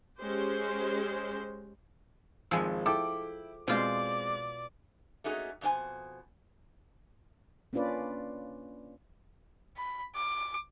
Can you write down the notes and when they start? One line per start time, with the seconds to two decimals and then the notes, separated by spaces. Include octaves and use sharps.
0.20 G#3 C#4 G4 C5
2.51 G#1 F3 G#3 G#5 E6
2.86 E4 A4 G5 D6
3.68 B2 G#3 C4 F4 C5 D5
5.24 A3 A#3 C#4 D#4 F#4 G#4
5.61 F2 B2 D4 C5 G#5
7.73 A#3 C#4 D4 F4 B4 D5
9.77 B5
10.15 D6